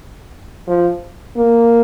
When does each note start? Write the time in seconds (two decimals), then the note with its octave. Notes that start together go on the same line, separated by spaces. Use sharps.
0.67 F3
1.37 A#3